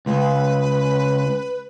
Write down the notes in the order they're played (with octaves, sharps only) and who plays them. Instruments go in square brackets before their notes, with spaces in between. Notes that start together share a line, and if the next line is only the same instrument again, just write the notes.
[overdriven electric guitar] C#2 [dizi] B4